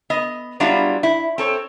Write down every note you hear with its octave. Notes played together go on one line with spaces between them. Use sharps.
B3 D#5
F#3 G3 B3 D4 E4 F4
E4
C4 A4 C#5